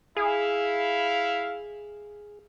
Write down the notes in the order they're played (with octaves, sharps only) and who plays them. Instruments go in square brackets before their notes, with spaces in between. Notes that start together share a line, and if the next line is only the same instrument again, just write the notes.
[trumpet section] E4 F5 [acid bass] G#4